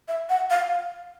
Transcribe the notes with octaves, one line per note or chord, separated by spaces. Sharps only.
E5
F#5
F5